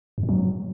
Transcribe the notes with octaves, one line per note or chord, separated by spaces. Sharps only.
F#2
A2
F#3